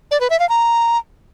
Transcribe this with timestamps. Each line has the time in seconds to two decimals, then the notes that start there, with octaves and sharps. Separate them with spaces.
0.11 D5
0.21 B4
0.30 E5
0.40 F5
0.49 A#5